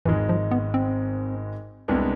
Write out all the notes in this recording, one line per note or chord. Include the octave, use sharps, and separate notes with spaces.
G#1 G#2 E3 G#3
F3
B3
C4
C2 C3 G#3 B3 D4